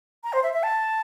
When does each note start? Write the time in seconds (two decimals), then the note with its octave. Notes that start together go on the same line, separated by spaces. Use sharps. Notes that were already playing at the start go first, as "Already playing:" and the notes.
0.24 A#5
0.33 C5
0.43 E5
0.53 E5
0.63 A5